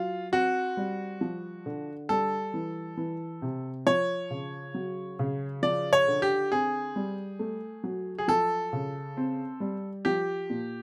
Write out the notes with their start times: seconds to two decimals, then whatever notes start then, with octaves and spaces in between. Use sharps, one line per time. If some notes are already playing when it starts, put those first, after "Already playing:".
Already playing: F#3 F4
0.32 C4 F#4
0.77 G3
1.21 F3
1.66 D3
2.09 G3 A4
2.54 E3
2.97 E3
3.42 C3
3.86 F3 C#5
4.30 C#3
4.74 F#3
5.19 C#3
5.63 F3 D5
5.93 C#5
6.08 D3
6.22 G4
6.52 C4 G#4
6.96 G3
7.39 A3
7.84 F#3
8.18 G#4
8.28 F3 A4
8.73 C#3
9.17 C4
9.60 G3
10.05 F3 G4
10.50 A#2